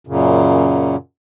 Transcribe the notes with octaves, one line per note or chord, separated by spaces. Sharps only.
F#2 A#2 C#3